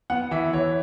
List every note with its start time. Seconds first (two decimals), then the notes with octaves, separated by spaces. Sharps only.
0.10 B3 F#5
0.31 E3 E5
0.53 E3 C#5